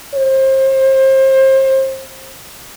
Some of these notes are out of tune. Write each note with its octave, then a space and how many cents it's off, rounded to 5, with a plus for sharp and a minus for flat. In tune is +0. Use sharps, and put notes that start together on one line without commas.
C5 +30